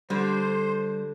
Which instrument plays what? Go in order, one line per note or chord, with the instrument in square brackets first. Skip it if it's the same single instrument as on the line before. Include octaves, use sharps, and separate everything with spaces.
[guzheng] D3 [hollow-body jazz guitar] G3 [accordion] C5